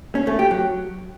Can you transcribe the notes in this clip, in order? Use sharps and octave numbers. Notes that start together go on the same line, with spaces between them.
C#4
A3
G4
F#3